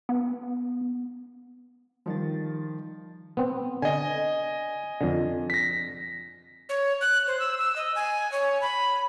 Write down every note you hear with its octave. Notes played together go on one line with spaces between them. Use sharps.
B3
D#3 F3 G3 A6
B3 C4
D3 D#5 G#5
F2 D3
A#6 B6
C#5
F#6
C5
E6
E6
D#5
G#5
C#5
B5